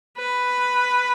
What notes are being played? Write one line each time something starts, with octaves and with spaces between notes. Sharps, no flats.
B4